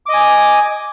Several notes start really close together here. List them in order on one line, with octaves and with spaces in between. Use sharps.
D6 D#5 D#6 G#5